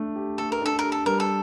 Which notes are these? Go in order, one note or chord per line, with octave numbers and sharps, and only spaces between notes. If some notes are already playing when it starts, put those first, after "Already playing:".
Already playing: A3 D4
G4
A3 A4
A#4
D4 A4
G4 A#4
A4
G3 A#4
A4